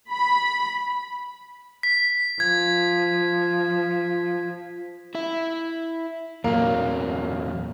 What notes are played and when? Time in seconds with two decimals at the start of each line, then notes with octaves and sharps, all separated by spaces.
0.10 B5
1.83 B6
2.40 F3 G#6
5.15 E4 E5
6.44 E2 A#2 F#3 A#3